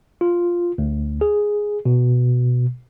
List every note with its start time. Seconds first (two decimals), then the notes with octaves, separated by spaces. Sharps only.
0.21 F4
0.78 D2
1.21 G#4
1.85 B2